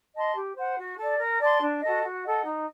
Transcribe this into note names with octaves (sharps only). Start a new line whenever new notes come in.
D#5 A5 C6
G4
C5 F#5
F#4
A4 D5
A#4
D5 A5 C6
D4
F#4 A4 D#5
F#4
A4 D#5 F#5
D#4